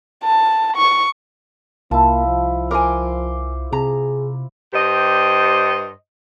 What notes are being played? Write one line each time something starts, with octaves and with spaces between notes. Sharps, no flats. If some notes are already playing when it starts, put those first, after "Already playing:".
A5
C#6
C2 A#3 E4 F4 A5
F3
A#4 C5 G#5 C6 D6
C3 G#4 A#5
G2 G4 C5 D#5